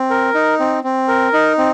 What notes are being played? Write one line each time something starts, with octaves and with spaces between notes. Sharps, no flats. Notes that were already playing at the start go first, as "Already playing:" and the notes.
Already playing: C4
A#4
D#4
C4
C4
A#4
D#4
C4